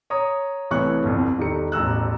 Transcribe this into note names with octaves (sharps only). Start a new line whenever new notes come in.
C#5 A#5 D#6
C2 E3 A3 C#5 C#6 F#6
G1 C2 F2
E1 D#3 G4 A4 C#7
E1 A1 A#5 E6 F#6